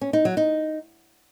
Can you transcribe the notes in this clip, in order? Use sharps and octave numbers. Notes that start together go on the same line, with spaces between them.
C#4
D#4
F#3
D#4